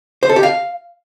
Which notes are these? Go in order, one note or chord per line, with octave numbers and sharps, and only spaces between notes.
C5
A4
G4
F5